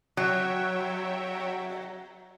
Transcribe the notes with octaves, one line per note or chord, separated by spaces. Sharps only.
F#3 C#5 E5 G5